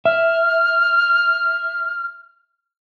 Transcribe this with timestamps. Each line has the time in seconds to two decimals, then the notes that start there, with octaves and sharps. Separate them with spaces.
0.05 E5 F6